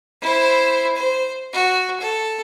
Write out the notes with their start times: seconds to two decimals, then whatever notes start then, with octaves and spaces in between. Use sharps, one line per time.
0.22 E4 C5
0.96 C5
1.53 F#4
2.00 A4